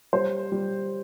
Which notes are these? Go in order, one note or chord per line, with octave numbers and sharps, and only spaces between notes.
G3 C5
G3